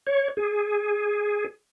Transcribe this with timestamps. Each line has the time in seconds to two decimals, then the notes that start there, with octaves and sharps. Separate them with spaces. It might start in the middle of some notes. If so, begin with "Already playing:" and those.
0.07 C#5
0.37 G#4